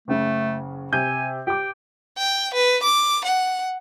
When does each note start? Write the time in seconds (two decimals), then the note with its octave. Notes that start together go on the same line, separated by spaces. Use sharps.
0.08 F#1 C#3 A3
0.93 C3 G#5 G6
1.47 G4 G5 D6
2.18 G5
2.54 B4
2.83 D6
3.25 F#5